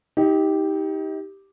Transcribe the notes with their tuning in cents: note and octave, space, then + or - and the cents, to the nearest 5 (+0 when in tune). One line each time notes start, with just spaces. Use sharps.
D#4 +30 G4 +0